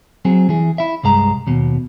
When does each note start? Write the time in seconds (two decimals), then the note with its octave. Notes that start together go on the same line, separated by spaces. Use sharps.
0.25 F#3 C4 G#4
0.49 E3 G#4
0.78 E4 E5
1.03 C2 G2 G#3 A#5
1.47 D#2 B2